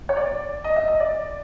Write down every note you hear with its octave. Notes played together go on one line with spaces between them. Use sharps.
C#5
D5
D#5
E5
D#5
D5